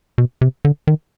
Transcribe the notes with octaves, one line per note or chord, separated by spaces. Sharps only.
B2
C3
D3
D#3